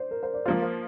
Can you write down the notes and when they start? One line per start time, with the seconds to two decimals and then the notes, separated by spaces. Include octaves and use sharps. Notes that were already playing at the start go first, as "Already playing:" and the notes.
Already playing: C5 D5
0.11 A#4
0.23 C5
0.34 D5
0.46 F3 A#3 F4 C5
0.62 C5